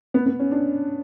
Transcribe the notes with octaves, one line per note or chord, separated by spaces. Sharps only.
B3
B3
C#4
D4